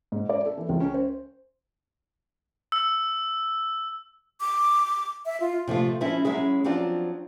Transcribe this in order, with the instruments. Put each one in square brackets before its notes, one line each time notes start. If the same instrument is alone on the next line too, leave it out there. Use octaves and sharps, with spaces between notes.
[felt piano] G#2
D5
A4
E3
C#2
C#4
C5
[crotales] E6
[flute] D6
E5
F4
[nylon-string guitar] C3 F3 A3 F4
F3 G#3 C4 C#4 E4
F#3 G#3 C#4 E4 G#4
F3 F#3 C4 D4 F4